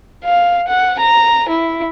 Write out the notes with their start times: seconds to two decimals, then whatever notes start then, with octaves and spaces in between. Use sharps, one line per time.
0.24 F5
0.68 F#5
0.99 A#5
1.49 E4